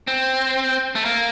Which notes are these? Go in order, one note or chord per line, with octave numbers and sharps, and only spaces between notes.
C4
A3
A#3